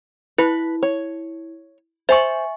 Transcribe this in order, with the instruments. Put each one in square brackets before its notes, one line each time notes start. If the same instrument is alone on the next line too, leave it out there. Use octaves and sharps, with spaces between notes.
[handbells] E4 [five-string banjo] B4
[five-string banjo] C#5
[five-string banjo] C5 [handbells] E5 G#5 C#6